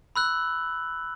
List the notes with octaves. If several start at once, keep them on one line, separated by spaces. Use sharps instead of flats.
B5 E6 F#6 F#7